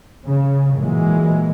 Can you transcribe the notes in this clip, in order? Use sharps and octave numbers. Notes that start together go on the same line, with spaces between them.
C#3
A#2 E3 F#3 G#3